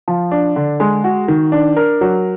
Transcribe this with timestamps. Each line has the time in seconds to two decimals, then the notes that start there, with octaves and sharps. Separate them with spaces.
0.08 F3
0.31 D4
0.56 D3
0.80 G#3
1.04 F#4
1.28 D#3
1.52 D4
1.76 A#4
2.01 F#3